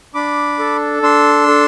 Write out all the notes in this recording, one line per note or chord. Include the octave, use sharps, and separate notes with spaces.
D4 B5 D6
A4
D4 C6 E6
A4